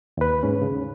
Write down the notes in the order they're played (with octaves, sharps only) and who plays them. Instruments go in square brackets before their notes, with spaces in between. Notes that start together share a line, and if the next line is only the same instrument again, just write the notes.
[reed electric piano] D#2 B4
G#2 C#4
C#3